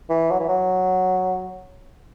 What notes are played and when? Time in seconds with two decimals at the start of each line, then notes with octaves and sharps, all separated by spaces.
0.10 E3
0.32 F#3
0.40 E3
0.49 F#3